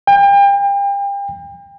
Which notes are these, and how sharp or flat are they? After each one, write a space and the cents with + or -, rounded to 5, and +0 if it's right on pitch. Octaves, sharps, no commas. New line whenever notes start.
G5 +35